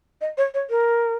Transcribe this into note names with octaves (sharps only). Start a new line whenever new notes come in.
D#5
C#5
C#5
A#4